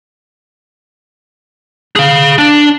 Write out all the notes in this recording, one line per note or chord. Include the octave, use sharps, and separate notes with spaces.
G#4 F5
D4